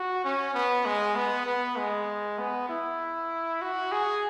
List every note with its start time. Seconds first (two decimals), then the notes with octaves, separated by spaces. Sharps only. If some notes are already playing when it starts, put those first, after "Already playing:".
Already playing: F#4
0.25 C#4
0.55 B3
0.86 G#3
1.16 B3
1.46 B3
1.78 G#3
2.39 B3
2.69 E4
3.62 F#4
3.92 G#4